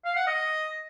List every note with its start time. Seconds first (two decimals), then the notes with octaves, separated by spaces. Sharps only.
0.05 F5
0.16 F#5
0.27 D#5